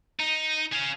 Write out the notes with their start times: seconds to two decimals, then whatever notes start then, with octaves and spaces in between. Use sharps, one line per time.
0.19 D#4
0.73 G#4 F5